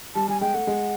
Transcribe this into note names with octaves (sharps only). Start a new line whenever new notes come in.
G3 A5
G3 G#5
G#3 G5
A3 F#5
G#3